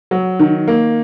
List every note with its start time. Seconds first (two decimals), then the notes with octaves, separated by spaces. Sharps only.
0.11 F#3
0.39 D#3
0.68 A#3